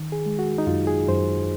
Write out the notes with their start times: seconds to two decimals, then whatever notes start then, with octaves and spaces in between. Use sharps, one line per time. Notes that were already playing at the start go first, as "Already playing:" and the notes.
Already playing: D#3
0.12 G#4
0.26 G#3
0.39 F#4
0.58 D#4
0.67 F#2 F4
0.87 G#4
1.08 F#2 C5